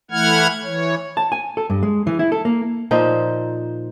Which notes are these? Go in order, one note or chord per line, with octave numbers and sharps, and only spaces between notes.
E3 A3 E4 F#5 F6 G#6
E3 C#5
A5
G#5
A4
G2
G#3
E3
E4
A4
A#3
A#2 F3 D#4 C5